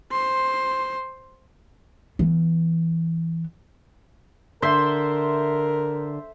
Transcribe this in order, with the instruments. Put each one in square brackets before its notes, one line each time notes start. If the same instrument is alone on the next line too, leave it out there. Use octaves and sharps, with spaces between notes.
[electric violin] C5 C6
[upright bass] E3 B3
[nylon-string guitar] D3 [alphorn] A#4 [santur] C5 E5 C6